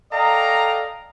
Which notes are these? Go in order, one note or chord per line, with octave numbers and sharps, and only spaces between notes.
A4 D5 D#5 F5 G5 A#5